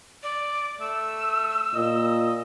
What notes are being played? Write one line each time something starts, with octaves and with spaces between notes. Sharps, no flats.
D5
A3 E6
A#2 D#5